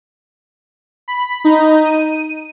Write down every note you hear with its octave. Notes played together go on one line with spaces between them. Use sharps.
B5
D#4
D#7